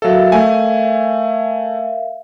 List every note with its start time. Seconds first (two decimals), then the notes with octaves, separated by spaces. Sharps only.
0.02 F#3 A4 A#4 E5 F5
0.32 A3 G#5